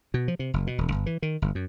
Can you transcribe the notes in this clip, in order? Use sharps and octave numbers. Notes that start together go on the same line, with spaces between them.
B2
F3
C3
F#1
B2
E1
G1
E3
D#3
G1
F#2